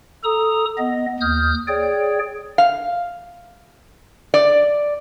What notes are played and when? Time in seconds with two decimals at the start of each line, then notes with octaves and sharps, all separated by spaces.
0.24 A4 A#5 D#6
0.78 B3 D#5
1.20 D#2 D#6 F6 G6
1.67 G#4 C#5 D5 G5
2.58 F5
4.34 D5